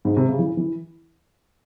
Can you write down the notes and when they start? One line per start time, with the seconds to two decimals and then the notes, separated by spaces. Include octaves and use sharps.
0.05 G#2
0.17 C3
0.29 C#3
0.39 E3
0.57 E3